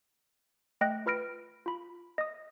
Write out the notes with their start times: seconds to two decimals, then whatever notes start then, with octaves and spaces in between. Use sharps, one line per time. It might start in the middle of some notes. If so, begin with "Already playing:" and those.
0.81 A3 D#5 G5 F#6 A#6
1.06 F4 B4 B5 F6 A#6 D7
1.66 F4 B5
2.18 D#5 D#6